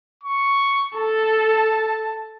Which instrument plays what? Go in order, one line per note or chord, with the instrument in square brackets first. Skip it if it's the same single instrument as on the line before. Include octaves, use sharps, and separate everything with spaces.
[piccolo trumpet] C#6
[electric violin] A4 [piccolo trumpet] A5